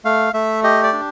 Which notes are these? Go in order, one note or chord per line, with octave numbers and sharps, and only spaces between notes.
A3 F5
A3 E5
G4 D#5
D5
D4